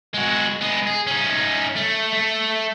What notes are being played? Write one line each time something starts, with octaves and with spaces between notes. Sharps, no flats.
G#3 F#4
G#3 B3
G#4
C#4 D#4
A3
A3